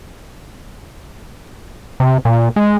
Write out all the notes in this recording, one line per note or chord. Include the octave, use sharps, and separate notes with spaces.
C3
A#2
G#3